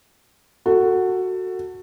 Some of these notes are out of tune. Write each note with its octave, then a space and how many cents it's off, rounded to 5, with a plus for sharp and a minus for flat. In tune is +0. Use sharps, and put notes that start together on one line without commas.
F#4 +0 A4 +25